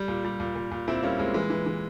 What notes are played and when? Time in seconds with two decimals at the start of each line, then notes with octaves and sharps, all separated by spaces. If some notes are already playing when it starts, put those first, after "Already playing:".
Already playing: G3
0.08 A#2
0.25 G3
0.40 A#2
0.55 A#2
0.71 A#2
0.88 A#2 C4 E4
1.03 G3 A#3 C#4
1.19 A#2 G#3 C4
1.34 E3 G#3
1.50 E3
1.66 E3